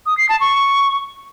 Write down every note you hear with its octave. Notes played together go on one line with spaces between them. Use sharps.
D#6
C7
A5
C#6